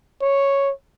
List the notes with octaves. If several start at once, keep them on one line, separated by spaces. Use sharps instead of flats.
C#5